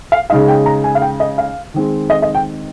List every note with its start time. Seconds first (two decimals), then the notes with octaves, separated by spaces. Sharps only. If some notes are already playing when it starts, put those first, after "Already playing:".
0.12 F5
0.30 C#3 G#3 D#4 F5
0.48 G5
0.66 A#5
0.84 G#5
0.95 F5
1.02 G5
1.20 D#5
1.38 F5
1.74 D#3 G#3 C4
2.10 D#5
2.22 D#5
2.35 G5